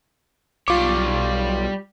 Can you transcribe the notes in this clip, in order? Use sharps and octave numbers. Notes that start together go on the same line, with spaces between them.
B1 G3 F4 C#5 D6